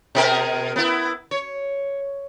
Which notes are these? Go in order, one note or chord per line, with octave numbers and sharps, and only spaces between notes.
B2 G#4 A#4
B3 E4
C#5